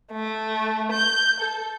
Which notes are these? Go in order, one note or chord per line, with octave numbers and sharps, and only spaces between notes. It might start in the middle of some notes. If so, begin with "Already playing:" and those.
A3
G6
A4